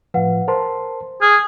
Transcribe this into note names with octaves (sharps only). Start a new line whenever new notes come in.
A2 F3 B4 F5 F#5
A#4 C5 A5 C6
G#4 F6